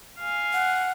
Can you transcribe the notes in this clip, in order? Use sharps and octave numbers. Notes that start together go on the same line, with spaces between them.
F5 G#5
F#5